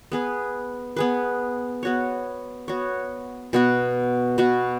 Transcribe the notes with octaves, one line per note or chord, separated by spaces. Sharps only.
B3 G#4 B4
B3 G#4 B4
B3 F#4 C#5
B3 F#4 C#5
B2 B3 F#4
B2 B3 F#4